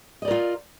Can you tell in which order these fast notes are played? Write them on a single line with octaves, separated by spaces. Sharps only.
D#5 D5 A#4 F4